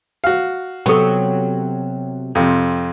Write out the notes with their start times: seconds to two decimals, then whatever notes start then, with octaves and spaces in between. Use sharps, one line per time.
0.24 F#4 F5
0.86 C3 F#3 B3 A4 G5
2.35 F2 C3